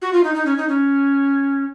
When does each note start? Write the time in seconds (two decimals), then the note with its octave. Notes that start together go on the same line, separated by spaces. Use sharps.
0.02 F#4
0.13 F4
0.24 D#4
0.35 D#4
0.46 C#4
0.57 D#4
0.69 C#4